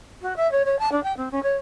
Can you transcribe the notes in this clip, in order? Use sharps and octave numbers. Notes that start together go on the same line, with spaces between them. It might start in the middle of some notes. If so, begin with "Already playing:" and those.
F#4
E5
C#5
C#5
A5
D4
G5
C4
C#4
C#5